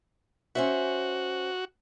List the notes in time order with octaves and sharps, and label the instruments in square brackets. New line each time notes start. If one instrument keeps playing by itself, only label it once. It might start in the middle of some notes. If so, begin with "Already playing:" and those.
[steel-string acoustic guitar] C#4 C5 E5 [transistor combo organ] F#4